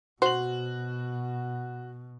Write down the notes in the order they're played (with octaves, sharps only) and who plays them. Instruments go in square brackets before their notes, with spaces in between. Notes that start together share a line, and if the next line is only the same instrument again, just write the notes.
[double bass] B2 [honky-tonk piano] F#4 F#7 [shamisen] C5